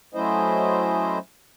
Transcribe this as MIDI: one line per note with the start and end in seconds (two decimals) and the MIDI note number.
0.14 1.18 54
0.14 1.18 57
0.14 1.18 61
0.14 1.18 64
0.14 1.18 72
0.14 1.18 75